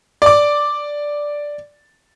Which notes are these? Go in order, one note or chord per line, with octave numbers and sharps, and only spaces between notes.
D5 D6